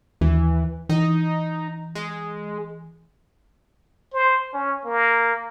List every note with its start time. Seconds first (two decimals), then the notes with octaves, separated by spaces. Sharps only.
0.21 D#2 E3
0.89 E3 D#4
1.95 G#3
4.14 C5
4.54 C#4
4.85 A#3